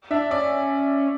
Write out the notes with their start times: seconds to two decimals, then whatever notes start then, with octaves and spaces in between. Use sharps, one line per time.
0.11 D4 E5
0.31 C#4 D5